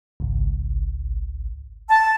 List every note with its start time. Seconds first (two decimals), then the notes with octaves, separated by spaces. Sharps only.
0.20 G#1 C#2
1.88 A5